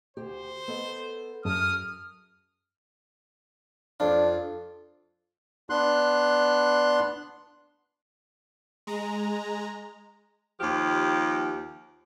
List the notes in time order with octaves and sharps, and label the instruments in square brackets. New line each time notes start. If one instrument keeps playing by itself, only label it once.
[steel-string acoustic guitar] D2 G4 [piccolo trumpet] C5
[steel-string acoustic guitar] B3 A4 D#5
[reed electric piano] F#2 [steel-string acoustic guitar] G#4 A5 [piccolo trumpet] D#6 [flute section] F6
[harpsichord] F2 F4 [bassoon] D4
[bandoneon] B3 D4 C6 F#6
[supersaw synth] G#3 A#5
[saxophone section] D#2 F3 G4